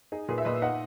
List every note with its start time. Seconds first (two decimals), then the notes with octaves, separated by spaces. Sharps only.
0.12 D#4 G#4
0.28 A#2 G#4 B4
0.38 E5
0.45 A#2 B4 D#5
0.62 D#4 D#5 F#5